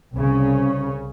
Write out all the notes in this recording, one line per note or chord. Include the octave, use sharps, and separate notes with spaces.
C2 C#3 C#4